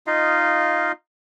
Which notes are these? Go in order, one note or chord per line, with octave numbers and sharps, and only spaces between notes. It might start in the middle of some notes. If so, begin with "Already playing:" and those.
D#4 F4 D#5 F5